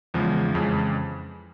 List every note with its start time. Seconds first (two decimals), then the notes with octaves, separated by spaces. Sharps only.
0.14 E2 C#3 F3 G#3
0.54 F2 C#3 E3 G#3